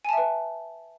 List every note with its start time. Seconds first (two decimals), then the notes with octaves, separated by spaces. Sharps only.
0.05 G#5
0.09 A5
0.13 E5
0.17 B4